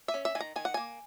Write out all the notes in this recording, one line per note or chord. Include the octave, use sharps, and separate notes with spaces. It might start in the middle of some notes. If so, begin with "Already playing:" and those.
E5
C#4
E5
D#3 G#5
A#5
D#3 G#5
F#5
A#3 G#5